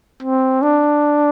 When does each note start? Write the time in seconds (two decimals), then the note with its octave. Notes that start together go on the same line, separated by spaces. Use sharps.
0.23 C4
0.62 D4